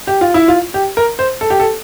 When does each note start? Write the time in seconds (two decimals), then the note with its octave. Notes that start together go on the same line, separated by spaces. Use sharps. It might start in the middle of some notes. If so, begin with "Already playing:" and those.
0.07 G4
0.21 F4
0.34 E4
0.48 F4
0.74 G4
0.97 A#4
1.19 C5
1.41 A4
1.50 G4
1.60 A4